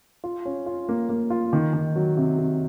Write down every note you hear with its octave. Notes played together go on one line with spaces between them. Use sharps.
F4
C#4
F4
A#3
A#3
F4
D#3
D#3
F#3
C3
C3